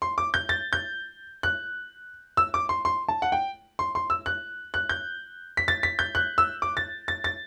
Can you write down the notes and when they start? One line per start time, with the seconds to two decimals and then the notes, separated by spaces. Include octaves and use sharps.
0.02 C6
0.18 D6
0.34 G6
0.49 A6
0.73 G6
1.43 F#6
2.37 E6
2.54 D6
2.69 C6
2.85 C6
3.08 A5
3.22 F#5
3.32 G5
3.79 C6
3.95 C6
4.10 E6
4.26 F#6
4.74 F#6
4.89 G6
5.57 B6
5.68 A6
5.83 B6
5.99 G6
6.15 F#6
6.38 E6
6.62 D6
6.77 A6
7.08 A6
7.24 A6